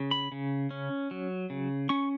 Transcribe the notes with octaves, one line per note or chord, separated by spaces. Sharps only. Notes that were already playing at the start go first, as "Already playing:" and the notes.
Already playing: C#3
B5
C#3
C#4
F#3
C#3
C#4 C#6